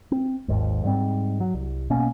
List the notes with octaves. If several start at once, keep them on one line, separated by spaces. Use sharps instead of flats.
C4
G#1 D#2 G#2
G#2 G3 C4
F#3
C2
B1 B2 A#3 C#4